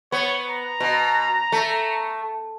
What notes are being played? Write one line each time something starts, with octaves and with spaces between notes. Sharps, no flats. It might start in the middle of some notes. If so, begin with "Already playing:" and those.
B3 C#5
A#5
B2
A3